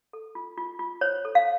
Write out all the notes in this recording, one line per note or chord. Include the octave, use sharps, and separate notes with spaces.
A4
F4
F4
F4
C5 C#5
A4
F5